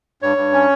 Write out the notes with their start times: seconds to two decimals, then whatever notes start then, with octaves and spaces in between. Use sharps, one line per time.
0.22 G2 C#5
0.37 G2
0.53 C#4